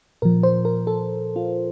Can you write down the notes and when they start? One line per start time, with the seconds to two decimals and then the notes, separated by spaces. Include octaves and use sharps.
0.22 A#2 F3 A#4
0.43 C5
0.65 A#4
0.87 A4
1.36 F4